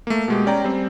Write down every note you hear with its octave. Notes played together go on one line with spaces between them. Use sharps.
A3 A#3
B2 G#3 G4
C#4 D5 G5 A#5
G3 C4